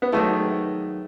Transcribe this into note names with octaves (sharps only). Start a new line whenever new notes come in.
B3
G#2 D#3 F#3 A3